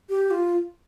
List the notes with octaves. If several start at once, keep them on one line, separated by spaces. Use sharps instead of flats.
G4
F4